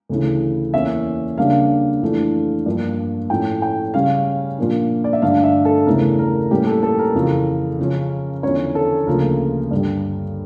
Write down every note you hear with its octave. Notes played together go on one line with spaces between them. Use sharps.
D2 C#3 E3
E2 E3 A#3 C#4 E5
C#3 G3 A#3 D4 F5
F2 E3 A3 D4
G2 F3 A#3 D4
A2 F3 A3 C#4 G5
G5
C#3 G3 C#4 F5
A#2 F3 A#3 D4
D5
E5
G2 D3 A3 D4 F5
E5
A4
E2 C#3 E3 A3 A#4
A#4
A2 G3 A#3 C#4 G4
A4
A4
A#4
F2 C#3 E3
C#3 F3 C#4
E2 D3 F3 C#4 C#5
A4
D2 C#3 F3 A#3 A#4
G2 D3 G3